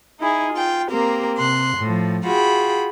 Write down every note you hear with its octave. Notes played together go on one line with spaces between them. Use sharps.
D#4 E4 G#4
F4 G5
A#3 C4 G4 A#4
C3 C6 F#6
A2 F3
F4 F#4 G#4 G5 B5